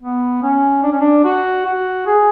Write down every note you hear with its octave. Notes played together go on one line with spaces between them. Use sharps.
B3
C#4
D4
C#4
D4
F#4
F#4
G#4